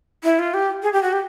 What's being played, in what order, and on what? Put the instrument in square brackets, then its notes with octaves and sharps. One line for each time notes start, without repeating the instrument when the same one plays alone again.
[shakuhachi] E4
F4
G4
G#4
G4
F#4
G4